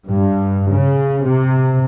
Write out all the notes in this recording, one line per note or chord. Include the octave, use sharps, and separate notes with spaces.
G2
C#3
C3